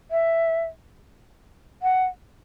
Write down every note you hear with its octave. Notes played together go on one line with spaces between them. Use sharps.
E5
F#5